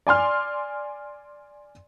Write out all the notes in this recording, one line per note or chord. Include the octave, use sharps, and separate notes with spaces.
D5 G#5 C6 F6